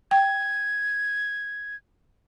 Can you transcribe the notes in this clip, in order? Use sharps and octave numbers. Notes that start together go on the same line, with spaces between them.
G5 G#6